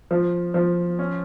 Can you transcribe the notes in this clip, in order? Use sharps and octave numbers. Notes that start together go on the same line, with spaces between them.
F3
F3
C#4